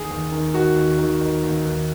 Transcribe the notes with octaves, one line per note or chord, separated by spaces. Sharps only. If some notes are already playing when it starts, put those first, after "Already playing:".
Already playing: D#2 G#4
D#2
D#3
D#3 F#4
D#2
D#3
D#3
D#2
D#2